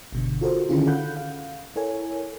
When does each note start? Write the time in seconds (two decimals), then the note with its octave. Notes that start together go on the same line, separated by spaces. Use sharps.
0.13 G1 B2 D3
0.41 F4 F#4 A4 A#4 C5
0.69 D3 D#3 C#4 E4 F4 G#4
0.86 A4 F5 F#5 B5 F#6 G6
1.17 F5
1.76 E4 A4 A#4 C#5 G#5